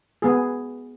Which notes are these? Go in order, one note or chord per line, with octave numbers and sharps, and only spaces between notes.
B3 G#4